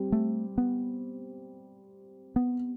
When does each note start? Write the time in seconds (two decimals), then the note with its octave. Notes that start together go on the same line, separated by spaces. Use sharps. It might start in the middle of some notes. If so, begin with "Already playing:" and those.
Already playing: G3 C4 G4
0.12 A3
0.58 B3
2.36 B3